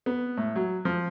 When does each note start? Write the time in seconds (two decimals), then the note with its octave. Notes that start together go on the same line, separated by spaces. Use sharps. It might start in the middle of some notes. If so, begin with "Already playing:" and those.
0.06 B3
0.37 A2
0.56 F#3
0.85 F3